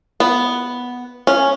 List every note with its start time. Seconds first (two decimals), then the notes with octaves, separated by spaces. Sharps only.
0.20 B3
1.27 C#4